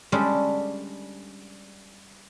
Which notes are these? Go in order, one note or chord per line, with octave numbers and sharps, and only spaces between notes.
G3 G#3 C#4 D4 G#4 A4